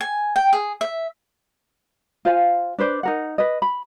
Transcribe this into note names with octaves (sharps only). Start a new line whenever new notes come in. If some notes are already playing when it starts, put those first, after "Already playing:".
G#5
G5
G#4
E5
F4 C5 F5 G#5
D4 B4 C5 D5
D#4 A#4 F#5
B4 D#5
B5